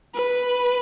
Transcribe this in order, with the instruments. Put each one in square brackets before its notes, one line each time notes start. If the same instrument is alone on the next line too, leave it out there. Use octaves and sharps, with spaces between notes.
[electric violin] B4